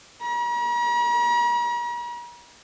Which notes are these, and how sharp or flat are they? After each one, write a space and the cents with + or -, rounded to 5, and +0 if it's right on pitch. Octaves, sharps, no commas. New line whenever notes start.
A#5 +45